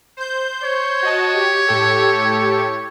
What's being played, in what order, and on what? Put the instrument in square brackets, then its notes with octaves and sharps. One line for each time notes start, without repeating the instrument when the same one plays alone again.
[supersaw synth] C5 G6
[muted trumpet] C#5
[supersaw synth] F#4 D#5 A5
G4
A2 G4 A4